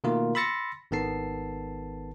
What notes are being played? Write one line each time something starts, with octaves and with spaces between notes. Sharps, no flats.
B2 D#3 A3 A#3 F4 A#4
B5 C6 E6 A6 A#6 C#7
G#1 D#3 B3 A4 A5 C7